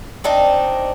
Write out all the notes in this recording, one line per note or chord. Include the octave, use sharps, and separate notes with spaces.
C4 D4 D#4